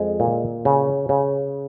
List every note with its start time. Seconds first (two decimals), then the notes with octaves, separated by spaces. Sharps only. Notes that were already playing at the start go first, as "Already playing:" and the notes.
Already playing: F2 G#3
0.20 A#2
0.65 C#3
1.09 C#3